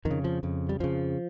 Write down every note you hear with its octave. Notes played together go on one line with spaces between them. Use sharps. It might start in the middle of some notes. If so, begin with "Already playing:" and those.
F2 D#3
C#3
F3
F2 C#3
G3
F2 C#3 F3